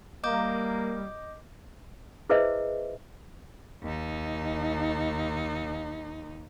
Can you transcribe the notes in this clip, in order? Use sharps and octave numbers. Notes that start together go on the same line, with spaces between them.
G3 A#3 D#5 D6 G6
E4 G#4 B4 C5 D#5 E5
D#2 D#4